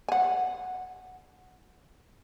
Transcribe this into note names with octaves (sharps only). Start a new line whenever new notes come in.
F#5 G#5